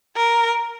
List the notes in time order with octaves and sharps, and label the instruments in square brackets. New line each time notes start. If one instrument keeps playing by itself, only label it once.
[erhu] A#4